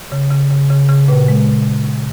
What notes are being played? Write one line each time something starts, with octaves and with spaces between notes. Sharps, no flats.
C#3
C#3
C#3
C#3
C#3
A#2 B4
G#3